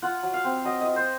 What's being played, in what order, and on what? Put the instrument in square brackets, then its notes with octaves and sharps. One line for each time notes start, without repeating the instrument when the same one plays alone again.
[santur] F4 F#5
F#3
F5
C4
F#3 D#5
F4 D#5
C5